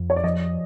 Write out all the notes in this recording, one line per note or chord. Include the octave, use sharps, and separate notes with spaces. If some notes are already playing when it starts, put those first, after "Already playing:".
Already playing: F2
C#5
D5
F3 D#5